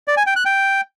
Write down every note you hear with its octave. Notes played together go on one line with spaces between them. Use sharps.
D5
G#5
G5
F#6
G5